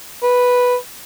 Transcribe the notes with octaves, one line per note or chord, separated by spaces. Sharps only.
B4